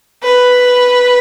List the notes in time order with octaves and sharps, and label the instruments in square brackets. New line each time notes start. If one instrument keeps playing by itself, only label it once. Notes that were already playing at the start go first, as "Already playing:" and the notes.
[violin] B4